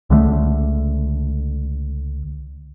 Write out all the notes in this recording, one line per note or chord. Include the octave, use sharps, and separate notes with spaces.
C#2 D3 G#3 A3